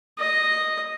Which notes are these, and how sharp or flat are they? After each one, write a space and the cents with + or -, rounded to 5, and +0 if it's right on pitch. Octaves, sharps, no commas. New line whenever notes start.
D#5 -5